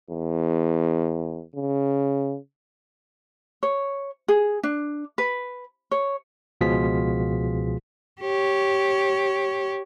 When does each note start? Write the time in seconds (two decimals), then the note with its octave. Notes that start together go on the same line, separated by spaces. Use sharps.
0.10 E2
1.56 C#3
3.63 C#5
4.28 G#4
4.63 D4
5.18 B4
5.91 C#5
6.61 C#2 B2 F3 F4 G#4 B6
8.21 G4 C#5